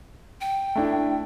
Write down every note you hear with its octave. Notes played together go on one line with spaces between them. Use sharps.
G5
A3 D4 E4